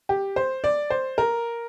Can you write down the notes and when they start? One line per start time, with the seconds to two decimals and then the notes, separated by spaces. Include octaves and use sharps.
0.09 G4
0.36 C5
0.64 D5
0.90 C5
1.18 A#4